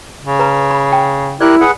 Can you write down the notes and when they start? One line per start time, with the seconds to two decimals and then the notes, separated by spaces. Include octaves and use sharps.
0.23 C#3
0.39 B4 A#5
0.71 B5
0.92 G5
1.41 E4 G4 A#4 D5 F#6
1.61 G#4 B4 F#5